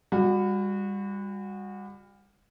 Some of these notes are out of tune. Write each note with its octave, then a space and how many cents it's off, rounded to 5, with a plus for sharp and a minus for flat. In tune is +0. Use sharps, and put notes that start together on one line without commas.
G3 +30 F#4 -20